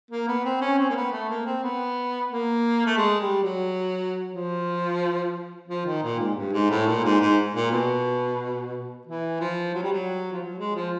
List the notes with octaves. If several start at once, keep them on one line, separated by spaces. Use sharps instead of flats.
A#3
B3
C4
C#4
C4
A#3
B3
A3
A#3
C4
B3
A#3
A3
G#3
G3
F#3
F3
F3
D#3
A#2
G#2
G2
G#2
A2
A#2
G#2
G#2
A#2
B2
E3
F3
F#3
G3
F#3
F3
F#3
G#3
F3